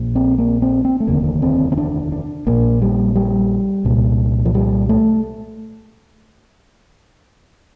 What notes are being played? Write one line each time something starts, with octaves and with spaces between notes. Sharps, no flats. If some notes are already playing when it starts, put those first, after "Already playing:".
Already playing: A#1 A#2
C4
A#3
C4
C4
A3
F1 D#2 D3 A#3
C4
C4
D4
D4
A#1 A#2 A#3
G3
G3
C2 A#2
F3
G3
A3